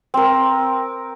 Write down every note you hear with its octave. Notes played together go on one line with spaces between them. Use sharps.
C4 A#4